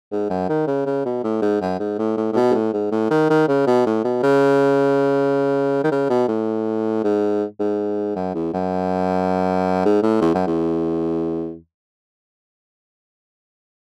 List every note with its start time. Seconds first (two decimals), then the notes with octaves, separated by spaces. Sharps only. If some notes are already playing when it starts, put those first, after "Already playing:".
0.12 G#2
0.30 F#2
0.49 D#3
0.67 C#3
0.86 C#3
1.05 B2
1.24 A2
1.42 G#2
1.61 F#2
1.80 G#2
1.98 A2
2.17 A2
2.32 A2
2.36 B2
2.51 G#2
2.54 A2
2.74 G#2
2.92 A2
3.11 D#3
3.30 D#3
3.48 C#3
3.67 B2
3.86 A2
4.05 B2
4.23 C#3
5.84 D#3
5.91 C#3
6.10 B2
6.28 A2
7.04 G#2
7.60 G#2
8.16 F#2
8.34 E2
8.53 F#2
9.85 G#2
10.03 A2
10.21 E2
10.34 F#2
10.47 E2